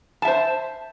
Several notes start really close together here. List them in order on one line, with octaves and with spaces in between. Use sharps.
A5 E5 C5